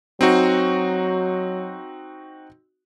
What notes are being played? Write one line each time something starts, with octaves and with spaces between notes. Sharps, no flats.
F#3 C4 D#4 F#4